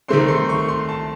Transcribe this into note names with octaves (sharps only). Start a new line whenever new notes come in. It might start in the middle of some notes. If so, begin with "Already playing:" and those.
D#3 A3 C4 C6
C6
C#6
C6
A5